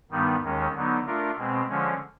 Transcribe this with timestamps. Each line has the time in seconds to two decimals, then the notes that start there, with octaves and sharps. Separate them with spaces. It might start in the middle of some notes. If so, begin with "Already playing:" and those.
0.11 G2 D#3 G3 B3 D#4
0.43 D#2 D#3 G#3 C#4
0.74 D3 F#3 B3 D#4
1.06 A3 D4 F4 A#4
1.37 B2 G#3 C4
1.68 D3 F3 G#3 C#4